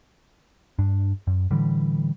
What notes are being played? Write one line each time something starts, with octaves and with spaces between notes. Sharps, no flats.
G2 D4
F#2
A2 D3 E3 G3